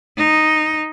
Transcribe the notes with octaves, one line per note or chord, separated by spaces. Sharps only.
D#4